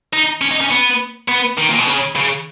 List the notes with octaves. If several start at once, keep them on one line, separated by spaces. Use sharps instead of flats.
D#4
C#4
D#4
C#4
B3
B3
D#3
A#2
B2
C#3
C#3